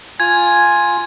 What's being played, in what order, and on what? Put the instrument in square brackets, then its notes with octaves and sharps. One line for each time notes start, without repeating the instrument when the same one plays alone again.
[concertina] F4 G#5 [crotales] G#6